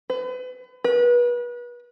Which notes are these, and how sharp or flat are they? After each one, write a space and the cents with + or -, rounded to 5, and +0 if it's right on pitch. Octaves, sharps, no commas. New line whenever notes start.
B4 +35
B4 -35